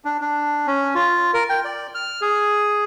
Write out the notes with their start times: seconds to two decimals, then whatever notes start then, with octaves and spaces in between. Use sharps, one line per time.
0.05 D4
0.21 D4
0.67 C#4
0.95 F4
1.34 A#4
1.49 G5
1.65 D5
1.95 F6
2.21 G#4